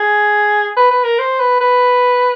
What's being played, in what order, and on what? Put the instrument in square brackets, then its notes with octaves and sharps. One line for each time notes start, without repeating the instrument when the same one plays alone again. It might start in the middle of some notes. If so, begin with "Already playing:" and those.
Already playing: [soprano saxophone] G#4
B4
B4
A#4
C5
B4
B4